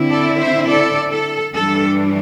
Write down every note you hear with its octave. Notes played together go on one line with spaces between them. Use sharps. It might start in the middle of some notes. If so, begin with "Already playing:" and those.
Already playing: D3 C4 E4
A4 D5
C5 E5
A4 D5
A4
G2 E3 G3 D4 A4